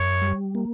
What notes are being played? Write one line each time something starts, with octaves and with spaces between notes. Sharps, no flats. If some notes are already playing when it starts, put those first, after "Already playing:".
Already playing: F#2 C#5
G3
A#3